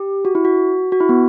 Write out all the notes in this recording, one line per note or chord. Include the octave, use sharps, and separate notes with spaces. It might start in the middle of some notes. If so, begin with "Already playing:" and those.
Already playing: G4
F#4
E4
F#4
F#4
E4
B3